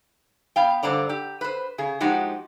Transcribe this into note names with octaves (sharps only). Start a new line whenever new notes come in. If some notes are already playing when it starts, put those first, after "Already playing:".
B3 F5 G5
G2 D3 C5 D5 A#5
G4
B4 C5
C#3 G#4
F3 G#3 D#4 F#4 G4